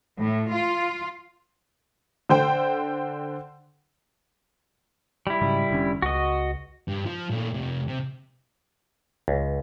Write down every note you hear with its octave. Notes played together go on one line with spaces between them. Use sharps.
A2
F4
D3 C5 G5
G3 E4
G#2 C#3 F#3
F1 D3 C#4
C#2 F#4 D#5
G2
F3
A#2 A3
F2 C3
C3
C#2